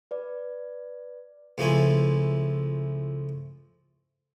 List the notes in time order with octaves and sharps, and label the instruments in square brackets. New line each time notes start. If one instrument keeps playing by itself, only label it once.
[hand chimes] B4 D5
[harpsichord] C#2 F3 A3 E4 G#5